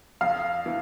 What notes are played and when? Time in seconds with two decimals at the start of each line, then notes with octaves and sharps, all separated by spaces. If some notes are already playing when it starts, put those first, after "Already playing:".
0.21 F2 F5
0.66 E3